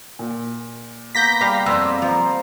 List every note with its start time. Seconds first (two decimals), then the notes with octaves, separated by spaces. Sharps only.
0.19 A#2
1.15 A#3 B3 G6 A#6 B6
1.41 G3 G4 F5 G5 B5
1.66 F2 D5 C6 E6
2.02 F3 C5 A#5